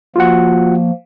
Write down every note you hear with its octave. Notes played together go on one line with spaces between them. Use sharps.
F3 A#3 F4 F#4 F#5